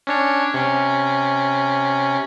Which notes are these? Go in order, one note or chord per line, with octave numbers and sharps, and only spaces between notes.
C#4 D4 C#5
C3 C#4